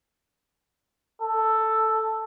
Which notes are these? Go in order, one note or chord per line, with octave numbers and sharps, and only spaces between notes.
A4